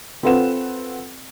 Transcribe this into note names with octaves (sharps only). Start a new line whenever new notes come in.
C4 F4 A4 B4 F#5 E7